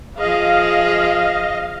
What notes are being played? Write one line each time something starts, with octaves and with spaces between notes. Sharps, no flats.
F3 G#4 D#5 F5